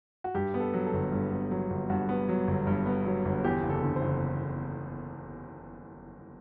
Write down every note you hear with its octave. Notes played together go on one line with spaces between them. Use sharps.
F#4
G2 G4
B3
A4
F#3
A4
G1
G2
B3
F#3
G1
G2 F#4
B3
F#3
G1
G2
B3
F#3
G1
E2 G4
F#1
A4
D3
C5
F#1